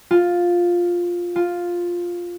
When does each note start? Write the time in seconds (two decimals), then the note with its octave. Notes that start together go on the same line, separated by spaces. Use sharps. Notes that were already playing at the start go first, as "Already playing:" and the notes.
0.11 F4
1.36 F4